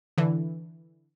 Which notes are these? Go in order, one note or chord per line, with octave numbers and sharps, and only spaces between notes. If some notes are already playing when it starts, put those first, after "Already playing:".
D3 E3